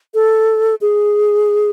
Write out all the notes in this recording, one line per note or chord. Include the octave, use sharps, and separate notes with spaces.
A4
G#4